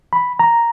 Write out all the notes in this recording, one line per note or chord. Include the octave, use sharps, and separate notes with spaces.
B5
A#5